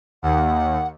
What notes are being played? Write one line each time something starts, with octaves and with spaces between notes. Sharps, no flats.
D#2 F#5